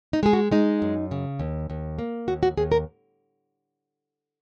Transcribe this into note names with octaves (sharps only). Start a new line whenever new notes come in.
D#4
G#3 G#4
F#4
G#3 D#4
F#2
C#3
D#2
D#2
A#3
D#2 F#4
F#4
D#2 G#4
A#4